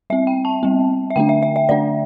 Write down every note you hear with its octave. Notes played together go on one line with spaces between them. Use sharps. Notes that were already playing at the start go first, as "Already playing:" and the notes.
G3 C4 E5
G5
A5
G3 C4
E5
D3 A3 D4 G5
E5
E5
E5
D3 A3 D4 D5